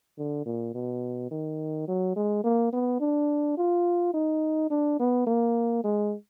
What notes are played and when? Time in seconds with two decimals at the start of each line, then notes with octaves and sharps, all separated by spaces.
0.18 D3
0.46 A#2
0.74 B2
1.31 D#3
1.88 F#3
2.16 G#3
2.44 A#3
2.73 B3
3.00 D4
3.57 F4
4.14 D#4
4.70 D4
4.99 B3
5.27 A#3
5.84 G#3